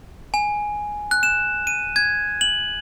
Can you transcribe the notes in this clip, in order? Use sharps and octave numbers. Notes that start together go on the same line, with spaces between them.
G#5
F#6
E7
D#7
G#6
F#7